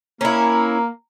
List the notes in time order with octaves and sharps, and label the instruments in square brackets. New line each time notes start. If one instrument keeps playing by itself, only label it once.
[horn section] A#3 [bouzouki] C#4 E4 [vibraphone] A#5